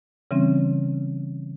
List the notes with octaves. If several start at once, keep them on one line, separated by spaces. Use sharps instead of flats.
C#3 E3 G3 C4 C#4